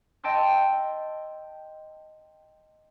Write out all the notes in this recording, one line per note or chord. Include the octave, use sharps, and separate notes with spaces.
D#5 G5 A5 C6 E6